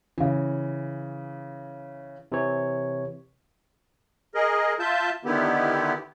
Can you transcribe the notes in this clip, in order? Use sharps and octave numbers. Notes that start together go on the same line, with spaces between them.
C#3 E3
C3 E3 C#5
G#4 A#4 D#5
F4 E5 A5 G6
D3 D#3 B3 E4 G4